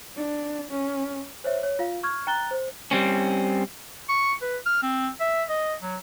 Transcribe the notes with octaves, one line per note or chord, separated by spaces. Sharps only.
D4
C#4
C5 C#5 E5
C#5
F4 F5
C#6 F6 G#6
G5 A#5 F#6 A6 G7
C5
G3 C4 C#4
C#6
B4
F6
C4
E5
D#5
F#3